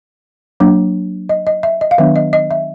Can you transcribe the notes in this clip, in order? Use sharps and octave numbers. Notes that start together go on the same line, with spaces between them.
F#3 A#3 D4
D#5
D#5
E5
D#5
F5
D#3 F#3 B3 D4 E5
D#5
D#5
E5